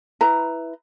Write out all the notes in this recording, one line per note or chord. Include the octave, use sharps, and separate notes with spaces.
E4 B4 A#5